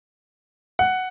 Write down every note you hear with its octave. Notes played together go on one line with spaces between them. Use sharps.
F#5